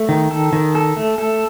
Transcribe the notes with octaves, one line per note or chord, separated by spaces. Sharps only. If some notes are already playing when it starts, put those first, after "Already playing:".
Already playing: A3
D#3
A4
D#3
A4
A3
A4